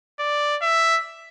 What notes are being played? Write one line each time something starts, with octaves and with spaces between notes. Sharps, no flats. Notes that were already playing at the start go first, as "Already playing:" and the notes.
D5
E5